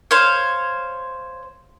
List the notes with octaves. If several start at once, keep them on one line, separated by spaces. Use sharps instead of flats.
C5 C#5 F5